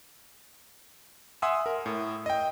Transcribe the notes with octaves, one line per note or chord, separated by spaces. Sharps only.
E5 F#5 G#5 C6 D#6 E6
A#4
A2
D#5 G5